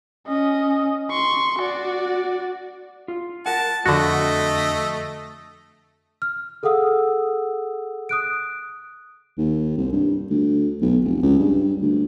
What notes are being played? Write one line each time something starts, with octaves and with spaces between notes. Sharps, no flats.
C#4 D#5
C6 C#6
F#4 D5
F4
A#4 F#5 A5
F2 D3 A3 F#4 D#5
F6
G#4 A4 F5 F#5 D#6 E6
D#6 F#6 D7
D#2
C2
G2
D2
B1
F1
C#2
G2
D2